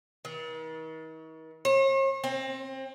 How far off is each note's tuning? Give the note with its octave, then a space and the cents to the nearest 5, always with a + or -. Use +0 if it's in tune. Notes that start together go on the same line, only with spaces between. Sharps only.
D#3 +45
C#5 -45
C4 +25